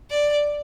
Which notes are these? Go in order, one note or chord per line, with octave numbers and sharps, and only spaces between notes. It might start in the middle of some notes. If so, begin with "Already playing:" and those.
D5